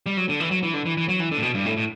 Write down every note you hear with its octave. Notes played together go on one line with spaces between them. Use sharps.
G3
F#3
D3
E3
F#3
E3
D3
E3
E3
F#3
E3
D3
A2
B2
G2
A2
A2